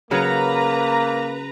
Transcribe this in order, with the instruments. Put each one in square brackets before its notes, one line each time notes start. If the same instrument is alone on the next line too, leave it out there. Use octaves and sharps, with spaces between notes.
[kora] C#3 F#3 [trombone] A#3 [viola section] B4 A#5